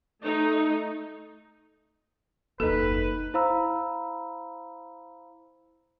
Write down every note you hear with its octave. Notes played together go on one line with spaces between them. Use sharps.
A3 D#4
F#1 D#2 A#3 D#4 A4 B4
E4 C5 F5 A#5 B5 E6